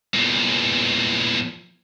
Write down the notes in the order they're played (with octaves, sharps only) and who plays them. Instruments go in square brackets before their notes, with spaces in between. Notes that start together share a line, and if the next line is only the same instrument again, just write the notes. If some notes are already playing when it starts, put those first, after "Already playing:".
[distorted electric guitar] E2 A#2